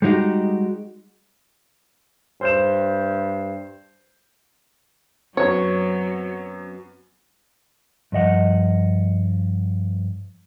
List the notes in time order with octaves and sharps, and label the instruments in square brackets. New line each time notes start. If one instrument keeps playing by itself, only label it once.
[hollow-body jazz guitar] G3 G#3 D#4 F#4 G4
[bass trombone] G2 [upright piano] C5 G6 E7
[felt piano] F#2 B3 [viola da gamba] F#3 [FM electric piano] C4 [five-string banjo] C#5
[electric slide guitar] G2 F3 D#5 F#5